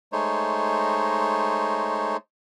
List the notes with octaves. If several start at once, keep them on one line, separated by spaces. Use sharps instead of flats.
G#3 A3 D#4 C5 C#5